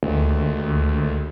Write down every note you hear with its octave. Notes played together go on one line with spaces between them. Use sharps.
D2